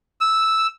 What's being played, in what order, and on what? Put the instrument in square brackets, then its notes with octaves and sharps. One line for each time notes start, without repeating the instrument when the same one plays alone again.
[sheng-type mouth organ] E6